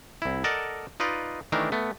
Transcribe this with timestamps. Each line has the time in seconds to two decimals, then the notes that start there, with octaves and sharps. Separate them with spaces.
0.22 C2 E4
0.44 A4 A#4 D5 D#5 F#5 A5
1.00 D#4 F4 B4 D5 D#5
1.52 D#3 E3 A3 D4 A#4
1.72 A3 B3